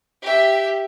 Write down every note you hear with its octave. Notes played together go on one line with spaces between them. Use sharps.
G4 E5